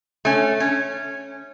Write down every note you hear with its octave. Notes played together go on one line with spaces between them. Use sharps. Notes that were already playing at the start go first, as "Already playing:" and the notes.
A3 C#4
C#4